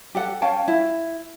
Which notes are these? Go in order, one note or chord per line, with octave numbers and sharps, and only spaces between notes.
G4 A4 F#5
C#4 F5 G5 A5
E4